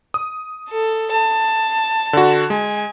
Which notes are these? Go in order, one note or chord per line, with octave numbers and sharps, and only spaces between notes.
D#6
A4
A5
D3 F#4
G#3 G#5